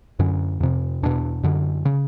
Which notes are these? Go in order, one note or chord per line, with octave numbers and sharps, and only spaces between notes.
F#2 D3 C#4
F2 C3
E2 B2 D4
F#2 D3
C#3